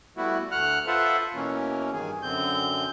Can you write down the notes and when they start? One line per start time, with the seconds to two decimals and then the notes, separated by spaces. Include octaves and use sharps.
0.17 G3 A3 B3 E4 F#4
0.51 D2 A3 F#5 F6 F#6
0.87 F4 A4 B4 C5 E5 F#5
1.34 B2 E3 A#3 C#4
1.93 G2 D#3 G#4
2.23 F#2 D3 C4 G6